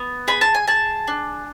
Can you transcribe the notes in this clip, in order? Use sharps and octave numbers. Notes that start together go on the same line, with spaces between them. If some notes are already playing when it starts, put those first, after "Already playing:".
Already playing: B3
G#4 B5
A5
G#5
G#4 A5
D4